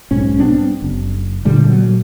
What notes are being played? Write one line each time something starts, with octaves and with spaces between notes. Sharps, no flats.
B1 G#2 C#4
G3 B3 C4 D4
F#1
A#2 D3 G3 A3
A#2 F#3